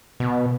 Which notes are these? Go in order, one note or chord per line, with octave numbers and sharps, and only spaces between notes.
B2